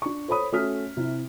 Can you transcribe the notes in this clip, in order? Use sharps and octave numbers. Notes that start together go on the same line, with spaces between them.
D4 C#6
A4 C5 C#5 B5 D#6
A3 C#4 F#4 D#6 F6 B6
C3 E4